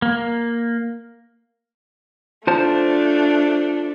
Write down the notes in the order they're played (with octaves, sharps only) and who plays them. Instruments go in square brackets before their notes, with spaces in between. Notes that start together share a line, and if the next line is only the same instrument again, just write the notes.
[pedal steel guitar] A#3
[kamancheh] A3 D4 [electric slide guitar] F4 C5 A5